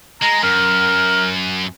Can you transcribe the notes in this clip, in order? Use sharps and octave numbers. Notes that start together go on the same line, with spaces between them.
G#3 A#5
F#2 A#4